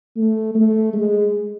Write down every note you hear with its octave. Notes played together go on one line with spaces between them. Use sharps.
A3
A3
G#3